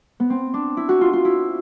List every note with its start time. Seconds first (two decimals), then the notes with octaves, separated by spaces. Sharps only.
0.20 B3
0.30 C4
0.54 D4
0.77 E4
0.89 F#4
1.01 F4
1.13 F4
1.25 E4